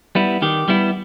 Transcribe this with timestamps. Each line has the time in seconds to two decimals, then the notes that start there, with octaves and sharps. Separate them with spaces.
0.15 G3 B3 E4
0.42 D#3 G4
0.68 G3 B3 E4